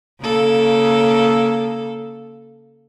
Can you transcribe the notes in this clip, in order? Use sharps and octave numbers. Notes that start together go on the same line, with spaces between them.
C#3 A#3 A4